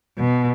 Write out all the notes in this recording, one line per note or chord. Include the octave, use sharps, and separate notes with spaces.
B2